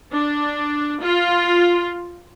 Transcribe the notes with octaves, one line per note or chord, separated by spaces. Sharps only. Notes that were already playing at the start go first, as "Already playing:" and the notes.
D4
F4